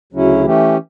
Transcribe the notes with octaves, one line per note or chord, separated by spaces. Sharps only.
D2 C#3 F#3 C#4 E4
E3 A3 C#4 G4